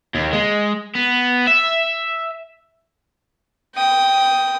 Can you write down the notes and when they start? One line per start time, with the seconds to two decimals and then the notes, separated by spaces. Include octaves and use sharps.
0.15 D#2
0.33 G#3
0.95 B3
1.47 E5
3.76 G5 D#6